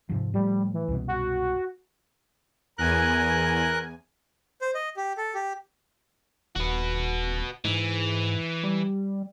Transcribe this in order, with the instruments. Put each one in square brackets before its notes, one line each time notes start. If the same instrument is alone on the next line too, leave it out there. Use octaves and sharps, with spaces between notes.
[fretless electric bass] G#2 C3 F3
[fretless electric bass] A2 F3 [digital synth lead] G3
[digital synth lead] E3
[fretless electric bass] C2 F#2 B2
[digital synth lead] F#4
[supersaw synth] E2 G#5 [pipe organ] A#4 F#6
[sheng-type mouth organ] C5
D#5
G4
A4
G4
[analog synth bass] D#1 [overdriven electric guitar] F#4 B4
[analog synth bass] G#2 [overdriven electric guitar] E3
[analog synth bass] G3